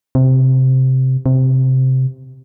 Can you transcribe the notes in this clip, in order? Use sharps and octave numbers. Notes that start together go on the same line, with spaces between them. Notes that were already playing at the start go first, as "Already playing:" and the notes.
C3
C3